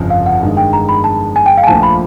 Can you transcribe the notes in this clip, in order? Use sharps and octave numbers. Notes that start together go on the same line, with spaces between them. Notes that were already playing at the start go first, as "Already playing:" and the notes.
Already playing: G1 F2 C#3 F3
F5
F#5
G2 D#3 G#3
G5
A#5
B5
A5
G#5
G5
F5
G#5
A#1 A#2 F3 A3 A5
B5